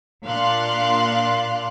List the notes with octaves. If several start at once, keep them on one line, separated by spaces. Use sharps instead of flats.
A#2 D4 F5 C6 F#6